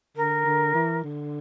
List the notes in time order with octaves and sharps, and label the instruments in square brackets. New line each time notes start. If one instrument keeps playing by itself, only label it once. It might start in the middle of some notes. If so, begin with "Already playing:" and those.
[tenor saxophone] D3 [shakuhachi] A#4
[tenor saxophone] D3
E3
D3